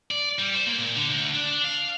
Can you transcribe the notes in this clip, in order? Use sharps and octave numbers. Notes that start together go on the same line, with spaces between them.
D5
G3
C5
A#3
A#2
D3
D2
D4
F5